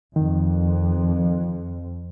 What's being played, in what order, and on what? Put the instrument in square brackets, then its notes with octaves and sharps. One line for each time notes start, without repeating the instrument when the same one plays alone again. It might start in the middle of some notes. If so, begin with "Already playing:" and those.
[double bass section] F2 [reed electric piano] D#3